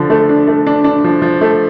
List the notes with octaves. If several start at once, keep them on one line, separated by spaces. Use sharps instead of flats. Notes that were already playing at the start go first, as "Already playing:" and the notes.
Already playing: D3 F3
A3
D4
A3
D4
D4
F3
F3
A3